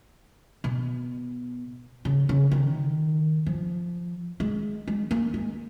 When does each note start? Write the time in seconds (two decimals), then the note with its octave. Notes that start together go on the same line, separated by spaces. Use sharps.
0.64 B2
2.05 C#3
2.29 C#3
2.52 D#3
3.46 F3
4.40 G#3
4.88 G#3
5.11 A#3
5.34 G#3